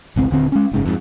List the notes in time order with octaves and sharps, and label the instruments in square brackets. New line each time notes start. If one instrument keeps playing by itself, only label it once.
[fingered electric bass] G#1 C#2 C4
D#1 D3 C4
G#3 C#4
F#1 G#2 C#3
F2 G#2